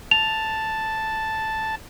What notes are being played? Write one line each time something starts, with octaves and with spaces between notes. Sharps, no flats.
A5 F7